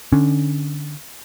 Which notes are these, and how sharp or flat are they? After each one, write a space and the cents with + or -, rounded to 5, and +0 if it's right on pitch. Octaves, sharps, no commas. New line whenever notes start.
D3 +15 C#4 +0